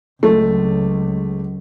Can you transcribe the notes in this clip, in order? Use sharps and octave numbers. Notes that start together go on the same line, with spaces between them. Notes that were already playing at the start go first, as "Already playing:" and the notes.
C#2 F#3 G#3 A3 C4